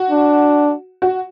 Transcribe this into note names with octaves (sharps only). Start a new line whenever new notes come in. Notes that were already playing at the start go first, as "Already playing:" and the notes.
Already playing: F#4
D4
F#4